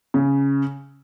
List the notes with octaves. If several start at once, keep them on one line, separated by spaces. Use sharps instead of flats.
C#3